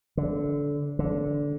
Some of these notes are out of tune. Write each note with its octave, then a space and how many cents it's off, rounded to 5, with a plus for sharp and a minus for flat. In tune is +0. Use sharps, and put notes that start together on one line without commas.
D3 -20
D3 -15